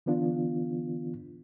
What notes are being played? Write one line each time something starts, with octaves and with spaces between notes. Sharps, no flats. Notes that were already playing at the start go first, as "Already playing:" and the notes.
D3 E3 B3 D4 F4